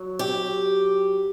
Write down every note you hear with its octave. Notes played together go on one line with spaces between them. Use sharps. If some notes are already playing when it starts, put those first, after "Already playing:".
Already playing: F#3
G4